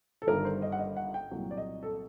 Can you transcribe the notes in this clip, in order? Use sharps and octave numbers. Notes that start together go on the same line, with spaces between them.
A4
G1 G2 D#3 G3 A#4
C5
D#5
F#5
D#5
F#5
G5
C2 A#2 F#3
D5
D#5
A4